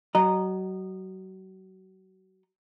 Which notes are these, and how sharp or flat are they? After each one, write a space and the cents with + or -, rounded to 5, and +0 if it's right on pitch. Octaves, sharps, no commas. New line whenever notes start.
F#3 +30 D#5 -20 A#5 +0